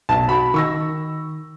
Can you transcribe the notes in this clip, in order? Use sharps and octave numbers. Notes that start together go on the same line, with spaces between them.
B1 A5
F#4 B5
D#3 C#6 E6 A#6